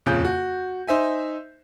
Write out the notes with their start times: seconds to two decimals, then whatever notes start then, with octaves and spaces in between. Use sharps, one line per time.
0.06 D#1 F2 C#3 G6
0.25 F#4
0.87 D#4 C5 E5 G#5